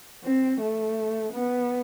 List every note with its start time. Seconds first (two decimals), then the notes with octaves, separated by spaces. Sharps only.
0.24 C4
0.61 A3
1.33 B3